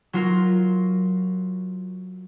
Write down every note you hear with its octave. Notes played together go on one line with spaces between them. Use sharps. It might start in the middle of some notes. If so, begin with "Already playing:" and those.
F#3 F4 A#4